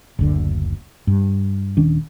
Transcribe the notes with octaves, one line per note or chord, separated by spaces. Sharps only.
F#1 D2 D3
G2
D#1 D#3 C#4 D4